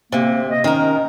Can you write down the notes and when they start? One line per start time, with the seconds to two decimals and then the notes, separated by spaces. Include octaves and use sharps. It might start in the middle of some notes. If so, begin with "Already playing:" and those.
0.12 D2 C3 A#3
0.49 D#5
0.64 D#3 C#4 A#4